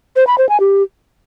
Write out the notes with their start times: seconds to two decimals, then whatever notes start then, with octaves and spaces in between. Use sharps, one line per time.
0.16 C5
0.27 B5
0.38 C5
0.49 G#5
0.60 G4